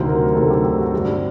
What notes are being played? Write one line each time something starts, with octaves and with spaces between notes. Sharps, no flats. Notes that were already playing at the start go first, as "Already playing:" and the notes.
Already playing: D2 C3 D#3 F#3 C5
A#4
D2 C3 D#3 F#3 A4
G4
G4
F#4
G2 D3 G3 C4